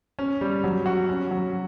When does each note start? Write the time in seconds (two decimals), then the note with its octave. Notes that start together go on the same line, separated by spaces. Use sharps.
0.19 C#4
0.41 G3
0.64 F#3
0.86 F#4
1.09 C#4
1.31 F#3